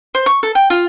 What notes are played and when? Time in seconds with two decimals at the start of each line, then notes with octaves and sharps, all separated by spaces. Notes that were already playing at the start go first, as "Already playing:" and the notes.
0.15 C5
0.26 C#6
0.43 A4
0.55 G5
0.70 F4